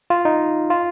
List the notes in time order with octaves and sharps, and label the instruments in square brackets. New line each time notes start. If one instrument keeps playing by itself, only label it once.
[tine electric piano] F4
D#4
F4